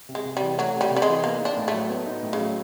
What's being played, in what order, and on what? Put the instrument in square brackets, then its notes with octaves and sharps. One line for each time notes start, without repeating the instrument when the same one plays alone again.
[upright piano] C3
[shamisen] G#3
[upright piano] C3
[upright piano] E3 [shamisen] G3
[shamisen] F#3 [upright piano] A3
[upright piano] C3
[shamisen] G3
[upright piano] C3
[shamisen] G3
G#3
[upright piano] E3
[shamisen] A#3 [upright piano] B3
[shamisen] D4 [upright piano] D#4
[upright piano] A2
[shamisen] A3
[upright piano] F#3
B3
D#4
A2
[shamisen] C#3
[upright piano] F#3